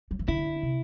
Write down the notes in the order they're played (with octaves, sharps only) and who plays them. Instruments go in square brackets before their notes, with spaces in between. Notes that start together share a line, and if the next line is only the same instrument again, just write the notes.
[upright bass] F#3
E3
[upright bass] D3 [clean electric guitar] E4
[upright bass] C3